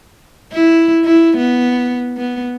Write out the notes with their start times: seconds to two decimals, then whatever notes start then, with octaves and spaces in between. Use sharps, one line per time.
0.52 E4
1.04 E4
1.36 B3
2.17 B3